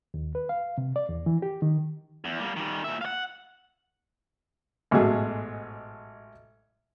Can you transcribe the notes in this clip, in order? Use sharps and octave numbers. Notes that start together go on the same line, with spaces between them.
D#2
B4
F5
C3
D5
E2
E3
G4
D#3
E2
G3 A#3
D#3 G3
A#2 E5
F5 F#5
A1 G#2 B2 F#3 A3 G#4